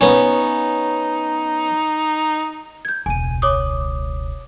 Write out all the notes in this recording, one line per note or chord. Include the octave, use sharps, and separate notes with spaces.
B3 C#4 D#4
G6 G#6
E1 C#2 G#5 D#7
C#5 D6 D#6